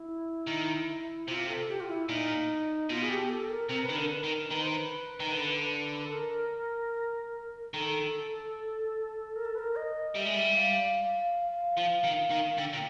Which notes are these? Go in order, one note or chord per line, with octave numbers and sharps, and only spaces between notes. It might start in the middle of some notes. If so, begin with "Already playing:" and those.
Already playing: E4
D#3
C3 F4
A4
G4
F4
E4
A#2 D#4
B2 F4
G#4
G4
A4
A#4
C3 A#4
B4
D#3
D3 A#4
B4
D#3 A#4
D#3 B4
C5
B4
D#3
D3
A4
A#4
D#3 A4
A#4
A4
B4
A#4
D#5
G3 E5
G#3
G3
F5
F3
D#3
D#3
D3 G5
A#2